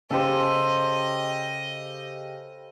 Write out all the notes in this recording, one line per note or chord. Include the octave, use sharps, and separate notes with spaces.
C#3 G4 A4 C5 D#5